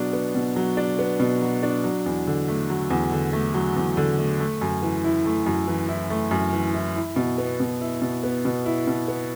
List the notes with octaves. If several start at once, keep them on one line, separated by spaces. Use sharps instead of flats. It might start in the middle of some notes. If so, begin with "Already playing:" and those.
Already playing: B2 F#3 B3 D4
B3
B2
F#3
D4
B3
B2
F#3
D4
F#3
E2
D3
A3
F#3
E2
D3
A3
F#3
E2
D3
A3
A3
F#2
E3
E4
A3
F#2
E3
E4
A3
F#2
E3
E4
E4
B2
B3
B2
E4
B2
B3
B2
E4
B2
B3